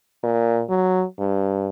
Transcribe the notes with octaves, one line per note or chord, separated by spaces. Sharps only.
A#2
F#3
G2